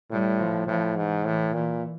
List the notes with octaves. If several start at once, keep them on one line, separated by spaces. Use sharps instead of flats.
A2 G3
F3
A2 F3
G#2 E3
A2 E3
A#2 E3